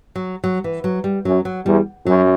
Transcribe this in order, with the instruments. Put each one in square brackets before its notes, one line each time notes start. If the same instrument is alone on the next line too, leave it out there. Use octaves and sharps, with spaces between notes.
[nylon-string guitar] F#3
F#3
E3
F#3
G3
[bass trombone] F#2 [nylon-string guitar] F#3
[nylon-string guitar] F#3
[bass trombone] E2 [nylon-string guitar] G3
[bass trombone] F#2 [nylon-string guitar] F#3